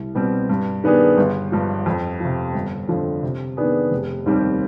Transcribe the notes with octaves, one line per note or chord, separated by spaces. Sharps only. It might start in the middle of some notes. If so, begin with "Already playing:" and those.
Already playing: C2
B2 G3 C4
G2
D#3 B3 D4 G#4
G1
G2 F3
F2
C3 F3
G1
F2 D3 F3
C3
D#3 B3 D4 G#4
F1
D#2 D#3 G3 C4